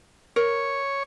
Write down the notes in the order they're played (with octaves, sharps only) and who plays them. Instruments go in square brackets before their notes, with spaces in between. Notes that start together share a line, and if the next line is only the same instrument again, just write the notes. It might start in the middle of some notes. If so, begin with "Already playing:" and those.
[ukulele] A#4 [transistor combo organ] C#5